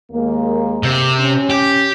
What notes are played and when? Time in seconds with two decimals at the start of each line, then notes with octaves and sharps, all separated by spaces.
0.12 D#2 G#3 A#3
0.83 C3
1.20 C#4
1.50 G4